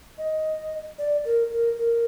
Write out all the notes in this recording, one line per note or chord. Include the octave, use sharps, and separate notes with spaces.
D#5
D5
A#4
A#4
A#4